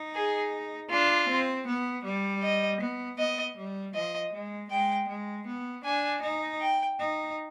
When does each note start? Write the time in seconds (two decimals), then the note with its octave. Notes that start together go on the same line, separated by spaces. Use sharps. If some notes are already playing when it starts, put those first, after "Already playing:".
Already playing: D#4
0.15 G#4
0.90 D4 F4
1.29 C4
1.67 B3
2.05 G3
2.43 D#5
2.81 B3
3.19 B3 D#5
3.57 G3
3.94 F3 D#5
4.33 G#3
4.70 G#3 G5
5.08 G#3
5.47 B3
5.85 D4 G#5
6.22 D#4
6.61 G5
6.99 D#4